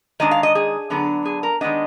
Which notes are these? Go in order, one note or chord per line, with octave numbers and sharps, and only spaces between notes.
D#3 G#3 D4 D#5
F5
D#5
G#4
D3 F#3 B3 D4
G#4
A#4
D#3 G#3 B3 D4 D#5